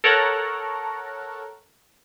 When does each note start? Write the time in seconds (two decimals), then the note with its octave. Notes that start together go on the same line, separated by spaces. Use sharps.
0.04 A4 A#4 C#5 F#5 A5 A#5